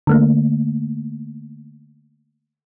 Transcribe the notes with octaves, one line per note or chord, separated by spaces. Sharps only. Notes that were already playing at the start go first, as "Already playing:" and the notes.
D3 A3 A#3